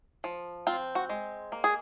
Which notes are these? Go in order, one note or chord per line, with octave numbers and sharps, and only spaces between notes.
F3
C4 F4
F#4
G#3
A#3
G#4